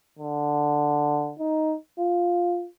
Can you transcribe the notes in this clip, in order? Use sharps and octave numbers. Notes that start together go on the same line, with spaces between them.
D3
D#4
F4